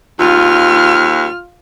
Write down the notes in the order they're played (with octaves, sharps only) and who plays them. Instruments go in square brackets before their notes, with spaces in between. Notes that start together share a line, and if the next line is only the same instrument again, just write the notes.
[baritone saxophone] D#2 [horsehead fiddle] F4 [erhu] F6